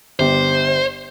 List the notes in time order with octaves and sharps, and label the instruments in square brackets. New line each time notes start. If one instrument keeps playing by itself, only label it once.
[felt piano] G1 G4 [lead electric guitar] C5